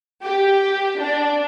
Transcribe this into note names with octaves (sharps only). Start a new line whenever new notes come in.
G4
D4